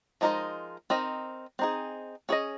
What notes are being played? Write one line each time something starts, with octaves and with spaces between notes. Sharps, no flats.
F3 G#3 D#4 A#4 D#5
C4 D#4 A#4 D#5
C4 D#4 G#4
C#4 G#4 D#5